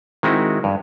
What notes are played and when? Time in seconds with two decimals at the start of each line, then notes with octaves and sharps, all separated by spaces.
0.23 D#3 G#3 C4 D#4 E4 F#4
0.64 G2